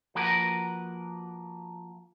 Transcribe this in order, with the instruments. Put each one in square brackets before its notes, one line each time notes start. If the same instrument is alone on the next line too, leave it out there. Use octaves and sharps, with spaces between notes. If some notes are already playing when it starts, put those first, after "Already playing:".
[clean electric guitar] F3 A#3 F#4 A#4 B4